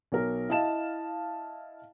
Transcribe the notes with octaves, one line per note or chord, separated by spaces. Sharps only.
B1 A#4
E4 D#5 F5 A5 E7